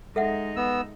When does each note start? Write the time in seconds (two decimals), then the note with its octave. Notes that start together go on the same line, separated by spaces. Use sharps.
0.16 G#3 D#4 A4 E5 F#5
0.56 B3 E6